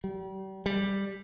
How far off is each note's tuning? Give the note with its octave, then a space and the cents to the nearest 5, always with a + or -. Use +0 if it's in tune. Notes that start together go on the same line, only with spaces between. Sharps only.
G3 -35
G3 +5